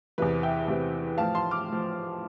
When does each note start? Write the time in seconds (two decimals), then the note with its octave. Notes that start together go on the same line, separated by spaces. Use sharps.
0.18 E2 C3 E3 B4
0.43 E5 G5
0.68 E2 C3 E3
1.18 A2 F3 F5 A5
1.35 A5 C6
1.51 D6 F6
1.68 A2 F3